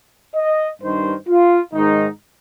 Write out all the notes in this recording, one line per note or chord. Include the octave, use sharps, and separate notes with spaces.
D#5
G2 D#3 C5
F4
G#2 D#3 D#4